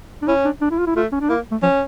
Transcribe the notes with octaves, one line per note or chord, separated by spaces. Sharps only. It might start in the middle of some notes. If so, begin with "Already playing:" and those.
D4
C#4 E4
D4
D4
E4
F4
E4
A3 F4
C#4
D4
A#3 E4
A3
F3 C#4